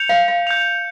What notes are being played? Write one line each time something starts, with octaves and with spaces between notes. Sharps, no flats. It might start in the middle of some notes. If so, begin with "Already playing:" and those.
Already playing: G6 C#7 F7
F5
F5
G6 C#7 F7